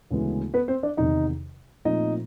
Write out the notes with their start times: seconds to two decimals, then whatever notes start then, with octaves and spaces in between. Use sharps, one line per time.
0.11 D2 C#3 E3 G#3 B3
0.54 B3 B4
0.68 C4 C5
0.83 D4 D5
0.97 E2 C3 D#3 D#4 D#5
1.85 A#2 F3 A3 C4 D#4 D#5